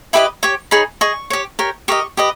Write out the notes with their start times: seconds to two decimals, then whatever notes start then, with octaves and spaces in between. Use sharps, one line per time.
0.13 E4 G4 B4 D#5 B5
0.43 G4 C#5 C#6
0.71 D#4 G#4 C#5 B5
1.01 G#4 D#5 C#6
1.30 G4 C#5
1.59 G4 A#4 C#5
1.88 G4 A#4 D#5 C#6
2.17 G4 B4 D#5